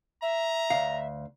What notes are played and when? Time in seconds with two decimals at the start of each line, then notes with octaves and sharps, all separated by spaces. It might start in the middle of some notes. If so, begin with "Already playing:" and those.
0.22 E5 A#5
0.70 D2 F5